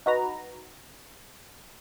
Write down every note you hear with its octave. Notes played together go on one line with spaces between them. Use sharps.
D#4 F#4 B4 A#5